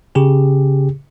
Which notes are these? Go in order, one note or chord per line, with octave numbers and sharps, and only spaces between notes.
C#3 G4 G#4